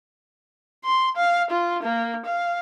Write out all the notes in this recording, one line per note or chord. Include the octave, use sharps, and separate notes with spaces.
C6
F5
F4
A#3
F5